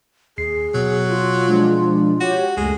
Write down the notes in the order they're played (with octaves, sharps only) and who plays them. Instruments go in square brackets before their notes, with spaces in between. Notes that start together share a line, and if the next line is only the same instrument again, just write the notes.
[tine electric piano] D#2 C7 [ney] G#4
[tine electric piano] B2 [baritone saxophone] F#3
[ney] F4
[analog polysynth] F3 G#3 D4
[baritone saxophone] F#4 [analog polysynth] G4 C#5
[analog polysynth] C#2 F#2 A3 [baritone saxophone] G#3